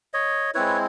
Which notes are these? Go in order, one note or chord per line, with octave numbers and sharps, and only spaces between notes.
C#5 D#5
G#3 C4 E4 B4 C#5